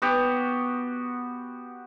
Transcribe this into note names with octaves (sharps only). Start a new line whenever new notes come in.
B3 F#4 G4